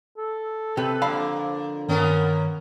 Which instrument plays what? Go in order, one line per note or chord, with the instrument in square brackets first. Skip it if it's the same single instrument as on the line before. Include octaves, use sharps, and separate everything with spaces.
[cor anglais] A4
[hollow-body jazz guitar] C3 G4 [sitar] B4
[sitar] F2 A#3 [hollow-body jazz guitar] D3 F5 B5
[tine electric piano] G2 D#3 [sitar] A#3 B3 C#4 [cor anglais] A#4